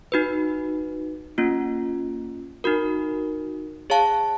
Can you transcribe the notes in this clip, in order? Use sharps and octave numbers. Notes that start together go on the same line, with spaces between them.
D#4 F#4 B4
A#3 C#4 F4
D#4 F#4 A#4
G#4 C#5 F5 A5